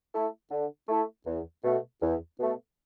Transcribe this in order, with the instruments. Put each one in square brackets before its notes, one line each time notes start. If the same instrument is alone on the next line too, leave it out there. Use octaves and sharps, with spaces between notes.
[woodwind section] A3 E4 A4
D3
A3 E4 A4
E2
B2 A3
E2
B2 A3